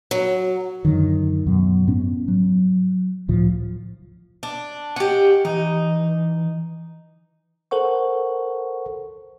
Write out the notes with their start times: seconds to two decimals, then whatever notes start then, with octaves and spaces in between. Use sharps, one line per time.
0.11 F#3
0.85 F#2 D3 D#3
1.47 F#2 B2 F#3
1.88 G#2 B3 C#4
2.28 F#3
3.28 C#2 A2 F3
4.43 D4
4.96 C#4 G4 D#5 F#5
5.45 E3 D#4
7.71 A4 A#4 C5 F#5 C#6